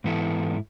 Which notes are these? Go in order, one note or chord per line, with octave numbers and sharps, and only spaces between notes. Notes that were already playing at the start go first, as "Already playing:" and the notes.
G#2 E3 B3 E4 A4